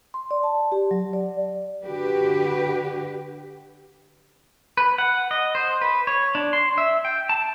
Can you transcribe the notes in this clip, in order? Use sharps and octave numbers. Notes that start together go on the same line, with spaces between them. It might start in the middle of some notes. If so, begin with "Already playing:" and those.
C6
D5
A5
G4
F#3
D5
D3 F#4 G4 B4
B4
F#5
D#5
C5
B4
C#5
D4
C6
E5
G5
A5